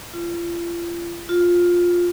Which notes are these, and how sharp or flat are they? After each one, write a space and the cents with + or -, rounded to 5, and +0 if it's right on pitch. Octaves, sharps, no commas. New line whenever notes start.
F4 -35
F4 +10